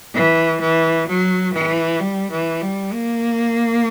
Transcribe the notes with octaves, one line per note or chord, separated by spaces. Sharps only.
E3
E3
F#3
E3
G3
E3
G3
A#3